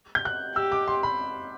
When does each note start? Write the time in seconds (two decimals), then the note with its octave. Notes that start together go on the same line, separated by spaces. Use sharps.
0.15 G6
0.25 F#6
0.56 G4 E6
0.72 D6
0.88 C6
1.03 B5